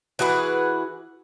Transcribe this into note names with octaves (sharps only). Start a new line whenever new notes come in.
E3 F#4 G#4 B4